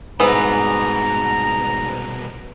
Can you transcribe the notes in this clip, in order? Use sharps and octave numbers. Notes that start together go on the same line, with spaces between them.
C2 G#2 B2 E3 B3 A#5